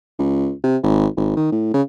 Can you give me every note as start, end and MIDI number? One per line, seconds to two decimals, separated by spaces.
0.19 0.52 37
0.64 0.77 48
0.83 1.06 32
1.16 1.33 32
1.36 1.50 51
1.52 1.70 45
1.74 1.82 49